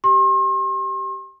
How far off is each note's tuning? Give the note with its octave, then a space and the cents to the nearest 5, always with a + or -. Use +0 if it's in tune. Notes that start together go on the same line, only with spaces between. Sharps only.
G4 -15 C6 +40